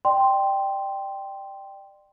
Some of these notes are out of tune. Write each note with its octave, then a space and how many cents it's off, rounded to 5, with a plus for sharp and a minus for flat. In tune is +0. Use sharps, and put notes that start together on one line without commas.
D5 +30 G5 +0 C6 +0